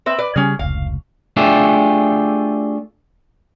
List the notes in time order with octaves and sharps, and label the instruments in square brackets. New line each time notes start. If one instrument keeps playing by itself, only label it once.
[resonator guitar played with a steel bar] C4 B4 E5
B4 D5
[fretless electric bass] C#3 G3 [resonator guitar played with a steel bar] C#4 G#4
[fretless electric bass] F1 C#2 [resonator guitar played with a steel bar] F5
[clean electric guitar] A3 D4 F4 G4 G#4 E5